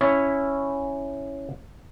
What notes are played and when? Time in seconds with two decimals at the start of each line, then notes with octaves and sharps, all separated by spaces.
0.01 C#4 E4 C#5